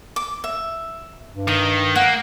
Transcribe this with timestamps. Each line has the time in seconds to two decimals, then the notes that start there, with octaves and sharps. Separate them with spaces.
0.16 D6
0.44 E5
1.29 G2
1.48 D#3 D#6
1.96 A#3 F#5